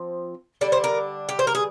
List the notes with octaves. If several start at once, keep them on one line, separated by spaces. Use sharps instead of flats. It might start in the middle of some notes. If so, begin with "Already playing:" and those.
Already playing: F3 C4
D3 G3 D4 D5
C5
A#4
G4
C5
A#4
G#4